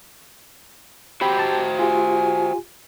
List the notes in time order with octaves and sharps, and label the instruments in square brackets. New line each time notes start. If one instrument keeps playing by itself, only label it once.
[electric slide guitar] F#4 C5 G5 [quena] G4 [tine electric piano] B5
[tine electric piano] A5
[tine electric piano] F4 G4 [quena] G#5